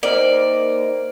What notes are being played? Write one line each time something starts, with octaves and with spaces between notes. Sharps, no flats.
A#3 D#4 A#4 C5 D5 F6